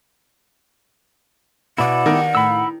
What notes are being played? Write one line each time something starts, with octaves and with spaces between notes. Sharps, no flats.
B2 E4 D5 F#5
D#3 D4 G4
A2 B5 E6